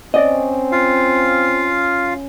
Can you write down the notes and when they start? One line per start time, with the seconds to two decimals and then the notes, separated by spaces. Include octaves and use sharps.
0.14 C4 C#4 D5 D#5
0.72 F4 F5